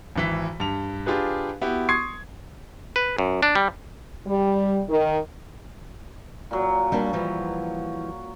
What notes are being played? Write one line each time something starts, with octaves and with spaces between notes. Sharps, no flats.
G#1 E3 B6
G2 F7
D4 F4 G4 G#4 B4
B3 E4 F#4 G4
C6 C#6 D#6 G#6 C7
B4
F#2
D4
G3
G3
D#3
A#2 F#3
G3 A#3 D4
E3 F3 G3